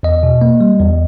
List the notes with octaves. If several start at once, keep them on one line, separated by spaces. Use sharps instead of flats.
E2 D#5
B2
A#3
G3
E2